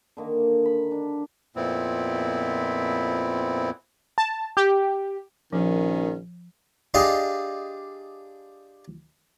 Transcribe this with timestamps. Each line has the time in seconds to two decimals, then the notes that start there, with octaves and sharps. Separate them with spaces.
0.17 D3 D#3 A#3
0.65 B5
0.91 D4
1.56 F2 A#2 B3 C4 E4
4.18 A5
4.57 G4
5.53 A#1 D#3 F3 C#4
6.94 D4 F4 G4 G#4 D#5